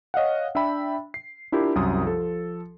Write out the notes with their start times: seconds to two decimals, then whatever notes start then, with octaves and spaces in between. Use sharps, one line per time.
0.14 C#5 D#5 F5 F#5
0.55 D4 E5 G5 B5
1.14 C7
1.52 D4 E4 F4 G4 A#4
1.75 C2 F#2 D#6
2.05 F3 A4